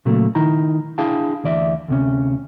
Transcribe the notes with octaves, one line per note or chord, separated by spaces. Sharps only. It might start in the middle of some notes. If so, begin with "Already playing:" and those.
A#2 C#3 F#3 A3 A#3
D#3 D#4 E4 A#5
D4 E4 G#4 F5 G5 A5
D2 E3 D5 E5
D2 C3 C#4